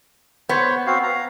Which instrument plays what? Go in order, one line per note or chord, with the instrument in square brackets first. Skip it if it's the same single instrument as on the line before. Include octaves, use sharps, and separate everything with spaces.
[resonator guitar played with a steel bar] B3 [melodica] C5 C#5
[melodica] C4 F#4 F5
F5 A#5